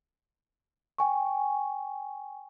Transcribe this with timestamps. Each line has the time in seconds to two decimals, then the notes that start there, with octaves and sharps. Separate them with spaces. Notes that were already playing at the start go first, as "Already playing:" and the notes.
0.98 G5 G#5 C#6